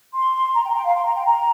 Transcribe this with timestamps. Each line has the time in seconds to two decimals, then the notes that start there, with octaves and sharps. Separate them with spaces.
0.14 C6
0.54 A#5
0.64 G5
0.70 A#5
0.75 G5
0.85 F5
0.95 C6
1.05 A#5
1.16 G5
1.25 A#5